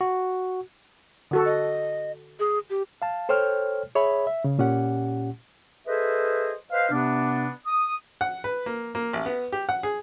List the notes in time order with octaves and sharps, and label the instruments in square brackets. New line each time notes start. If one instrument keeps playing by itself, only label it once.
[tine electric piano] F#4
[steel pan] D3 F#4 A4
[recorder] D#5
G#4
G4
[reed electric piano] F5 A5
A4 C5 C#5 G5 F6
G#4 C#5 E5 B5
E5
C#3
A#2 C#4 G4 F#5
[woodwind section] G#4 A4 B4 C5 D#5 E5
B4 C5 D#5 F5
C3 B3 D4
D#6
[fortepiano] F#5
B4
A#3
A#3
A1
B3
G4
F#5
G#4